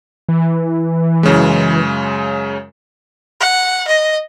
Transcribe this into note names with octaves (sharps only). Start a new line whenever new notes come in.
E3
F#2 C#3 G#3
F#5
D#5